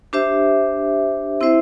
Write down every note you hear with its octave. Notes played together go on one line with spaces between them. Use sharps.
D4 G4 C5 E5
C4 E4 C5 E5